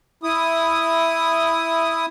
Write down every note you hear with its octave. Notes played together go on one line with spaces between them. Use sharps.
E4 D#6